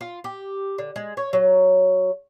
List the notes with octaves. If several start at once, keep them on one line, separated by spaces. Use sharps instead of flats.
F4
G4
D3
G#3
C#5
F#3